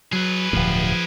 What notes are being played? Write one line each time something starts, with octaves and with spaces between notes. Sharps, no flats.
F#3 G#4 B4
D1 G2 F3